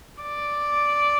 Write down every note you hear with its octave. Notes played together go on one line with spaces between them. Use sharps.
D5